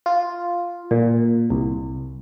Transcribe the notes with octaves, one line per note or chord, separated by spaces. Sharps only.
F4
A#2
C2